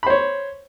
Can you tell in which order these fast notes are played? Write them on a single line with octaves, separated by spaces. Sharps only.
B5 C5 C#5